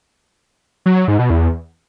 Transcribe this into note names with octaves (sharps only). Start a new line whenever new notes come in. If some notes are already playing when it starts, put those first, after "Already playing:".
F#3
F#3
G#2
B2
E2